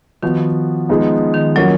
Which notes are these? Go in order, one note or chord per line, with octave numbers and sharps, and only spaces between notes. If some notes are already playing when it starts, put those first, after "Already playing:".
D#3 F3 B3 F#4
F3 G#3 B3 D#4
D#3
F3 F#3 A#3 C#4 F#4